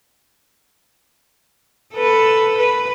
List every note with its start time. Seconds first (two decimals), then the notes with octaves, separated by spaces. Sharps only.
1.95 A4 B4
2.58 B4